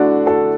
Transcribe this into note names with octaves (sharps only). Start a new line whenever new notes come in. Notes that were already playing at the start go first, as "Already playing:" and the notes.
Already playing: D3 A3 D4 E4 F#4
F#4 A4